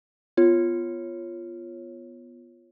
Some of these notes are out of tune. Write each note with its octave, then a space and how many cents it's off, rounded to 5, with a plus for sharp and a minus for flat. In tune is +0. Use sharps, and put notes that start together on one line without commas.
B3 +0 F4 -10 C#5 -20